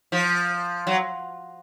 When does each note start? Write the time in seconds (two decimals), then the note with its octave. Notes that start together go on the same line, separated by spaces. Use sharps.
0.12 F3
0.87 F#3